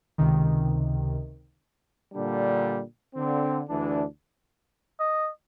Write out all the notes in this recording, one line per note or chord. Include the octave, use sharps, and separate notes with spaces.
C#2 C3 D#3
A#2 D3 G3 D4
D3 C4
D2 E3 D4
D#5